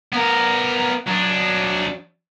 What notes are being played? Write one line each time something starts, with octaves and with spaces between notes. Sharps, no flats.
B3 A#4
F#3 D4